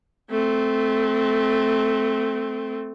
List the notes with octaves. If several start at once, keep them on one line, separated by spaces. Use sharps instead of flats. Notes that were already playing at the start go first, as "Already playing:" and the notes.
A3 C4